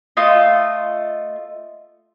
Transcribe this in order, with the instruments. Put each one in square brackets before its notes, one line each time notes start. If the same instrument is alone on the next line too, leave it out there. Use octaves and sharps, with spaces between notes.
[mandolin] A3 F4 D#5